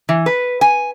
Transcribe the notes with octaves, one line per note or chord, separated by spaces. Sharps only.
E3
B4
G#5